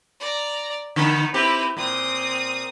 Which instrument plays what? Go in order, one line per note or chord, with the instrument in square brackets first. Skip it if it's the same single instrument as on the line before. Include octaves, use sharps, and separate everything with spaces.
[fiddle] D5 A#5
[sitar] D3 D#3 [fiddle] B3
[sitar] C4 G4 [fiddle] E4 B4
[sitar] A#2 [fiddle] C4 D#6